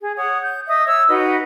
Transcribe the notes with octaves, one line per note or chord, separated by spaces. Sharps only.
G#4
C#5 F#5 D#6
G6
D#5 E5 D#6
C#5 E6
D#4 F#4 B4 D#5